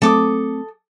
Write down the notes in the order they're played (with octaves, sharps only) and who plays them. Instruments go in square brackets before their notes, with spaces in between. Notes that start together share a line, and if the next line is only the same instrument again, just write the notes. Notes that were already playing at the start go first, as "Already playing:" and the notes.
[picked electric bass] F#3 A3 C4 [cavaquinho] A4 D6 D#6